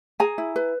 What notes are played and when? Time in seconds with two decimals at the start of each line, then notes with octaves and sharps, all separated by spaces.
0.20 G#4 G#5 A#5
0.38 E4
0.56 B4